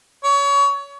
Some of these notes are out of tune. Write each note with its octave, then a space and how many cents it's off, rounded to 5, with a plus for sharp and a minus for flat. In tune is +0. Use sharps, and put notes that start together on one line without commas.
C#5 +25